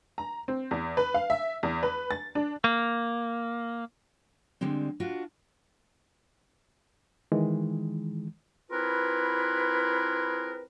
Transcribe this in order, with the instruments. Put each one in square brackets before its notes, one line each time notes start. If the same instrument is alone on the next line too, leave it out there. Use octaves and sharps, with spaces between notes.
[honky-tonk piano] A#5
C4
E2
B4
F5
E5
E2
B4
A6
D4
[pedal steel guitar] A#3
[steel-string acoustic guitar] D3 G3 G#3 C4
D4 F4 F#4
[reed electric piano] D#3 E3 G#3
[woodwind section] C4 E4 F4 G#4 A#4 B4